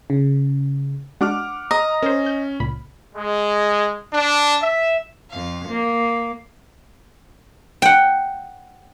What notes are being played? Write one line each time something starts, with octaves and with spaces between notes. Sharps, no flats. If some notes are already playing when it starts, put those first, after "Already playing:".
C#3
G#3 D4 F#4 F#5 D6 F6
D#5 A#5
C#4 A#4 C5
G6
C#2 A#2 B5
G#3
D4
E5
F2 F5
A#3
F#5 G5